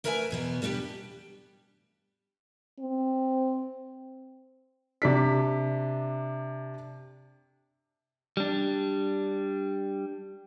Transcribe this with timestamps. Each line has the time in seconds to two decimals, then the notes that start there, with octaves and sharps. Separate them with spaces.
0.04 A3 A#4 B4 E5 F#5 G#5
0.30 E2 B2 B3
0.62 G3 B3 D4 D#4 G4
2.80 C4
5.02 C3 D4 B6
8.37 G3 D4